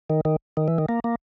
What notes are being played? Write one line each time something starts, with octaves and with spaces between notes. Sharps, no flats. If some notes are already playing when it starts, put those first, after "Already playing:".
D#3
D#3
D#3
E3
D#3
A#3
A#3